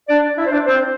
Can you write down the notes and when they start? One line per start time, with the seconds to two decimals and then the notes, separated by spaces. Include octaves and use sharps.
0.09 D4 D5
0.38 E4 E5
0.46 C5
0.52 D4 D5
0.66 C4 C5